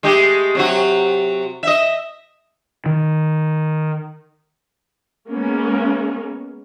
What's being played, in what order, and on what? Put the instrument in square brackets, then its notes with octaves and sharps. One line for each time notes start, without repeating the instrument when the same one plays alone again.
[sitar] G#3 A3 G4
C3 F#3 F#4
D#5 E5
[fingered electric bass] D#3
[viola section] G#3 A#3 B3 C#4